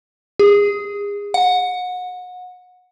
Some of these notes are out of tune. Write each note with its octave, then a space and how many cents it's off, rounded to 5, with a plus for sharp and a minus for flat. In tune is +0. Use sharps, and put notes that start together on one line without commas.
G#4 -35
F#5 -30